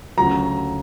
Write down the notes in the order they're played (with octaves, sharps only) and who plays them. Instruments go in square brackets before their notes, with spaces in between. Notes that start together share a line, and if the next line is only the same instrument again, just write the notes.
[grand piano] D2 C#3 F#3 A#5